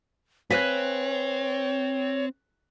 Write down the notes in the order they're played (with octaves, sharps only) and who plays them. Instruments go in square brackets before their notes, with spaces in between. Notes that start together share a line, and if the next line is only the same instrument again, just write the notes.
[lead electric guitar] C4 [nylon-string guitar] B4 F5 G#5 [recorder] C#5 [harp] F#6 B6